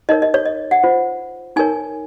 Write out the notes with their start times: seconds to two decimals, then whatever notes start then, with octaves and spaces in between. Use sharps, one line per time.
0.09 D#4 A#4 C#5 D#5
0.22 D#5
0.34 C#5
0.46 D#5
0.71 F#5
0.83 F4 C5
1.56 D#4 A#4 C#5 G#5